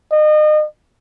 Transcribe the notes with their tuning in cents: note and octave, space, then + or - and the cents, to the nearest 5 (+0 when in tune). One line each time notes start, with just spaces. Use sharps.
D#5 -35